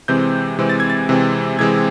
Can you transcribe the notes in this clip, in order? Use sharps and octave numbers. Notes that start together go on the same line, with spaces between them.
C3 E3 G#3 C4 G6
C3 E3 G#3 C4
A6
G#6
A6
C3 E3 G#3 C4
C3 E3 G#3 C4 G#6